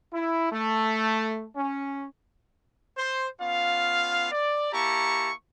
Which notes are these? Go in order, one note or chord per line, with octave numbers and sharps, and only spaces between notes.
E4
A3
C#4
C5
B3 C#4 F4 F5
D5
A#3 E4 G4 A5 A#5 C#6